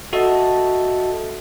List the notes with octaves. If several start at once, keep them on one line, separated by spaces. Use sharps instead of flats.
F#4 A4 D#5 E5 A5